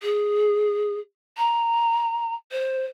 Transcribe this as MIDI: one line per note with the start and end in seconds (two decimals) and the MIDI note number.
0.02 0.98 68
1.37 2.34 82
2.51 2.85 72